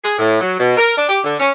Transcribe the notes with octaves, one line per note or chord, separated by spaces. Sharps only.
G#4
A2
F#3
B2
A#4
D4
G4
D3
C#4